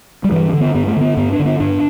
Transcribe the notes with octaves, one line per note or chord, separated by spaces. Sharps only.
G3
G2 E3
D3
B3
G2 B3
A3
D3 B3
G2 B3
D4
D3
B3
G2 D4